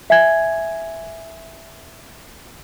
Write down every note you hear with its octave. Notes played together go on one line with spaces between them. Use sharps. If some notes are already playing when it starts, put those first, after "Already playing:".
E5 G#5 G#6